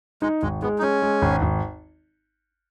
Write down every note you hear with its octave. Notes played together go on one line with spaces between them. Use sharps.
G#3 D#4
G#1 G#3
G#3 B3
D#4
G#3 C#4
G#3
G#1
G#1